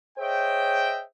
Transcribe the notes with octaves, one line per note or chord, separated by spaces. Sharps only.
G#4 C5 C#5 D#5 E5 G5